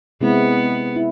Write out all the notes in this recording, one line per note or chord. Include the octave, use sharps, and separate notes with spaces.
C3 G#3 B3 C4 E4
E4